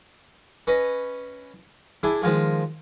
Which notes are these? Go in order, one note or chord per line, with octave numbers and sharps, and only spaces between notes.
C#4 B4 D#5
D4 E4 G#4
D#3 F3 G#3 F4 G#4